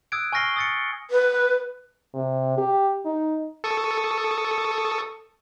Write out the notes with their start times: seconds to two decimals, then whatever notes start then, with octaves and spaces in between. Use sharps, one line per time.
0.12 D#6 E6 F#6 G#6 D7
0.32 G#5 C#6 F6 A#6 C7 G7
0.56 D#6 A6 C#7
1.11 B4
2.14 C3
2.58 G4
3.05 D#4
3.64 A4 C#6 D#6